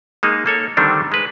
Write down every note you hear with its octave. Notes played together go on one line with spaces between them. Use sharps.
G#3 A#3 D#4
A#3 A4 C#5
D3 D#3 G3 A3 C4 D4
G#3 B4